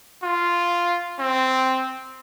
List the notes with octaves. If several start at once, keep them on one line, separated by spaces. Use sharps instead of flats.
F4
C4